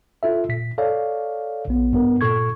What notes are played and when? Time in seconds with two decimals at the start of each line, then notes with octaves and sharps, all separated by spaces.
0.23 F4 A4 E5
0.49 A#2 B6
0.78 A4 C#5 D5 F5
1.68 A#1 B3
1.93 G2 B3 A#4
2.21 A#2 A4 C#6 G#6